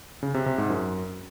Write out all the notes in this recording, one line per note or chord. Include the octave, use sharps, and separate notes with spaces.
C#3
C3
C3
G#2
F#2